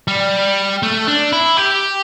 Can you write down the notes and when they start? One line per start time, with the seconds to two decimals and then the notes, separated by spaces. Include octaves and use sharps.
0.08 G3
0.83 A3
1.08 D4
1.32 E4
1.57 G4